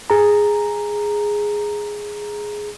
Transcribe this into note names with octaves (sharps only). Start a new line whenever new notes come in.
G#4 A#5